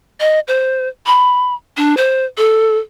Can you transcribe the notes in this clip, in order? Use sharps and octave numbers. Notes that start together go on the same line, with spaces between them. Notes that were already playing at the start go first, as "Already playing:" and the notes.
D#5
C5
B5
D4
C5
A4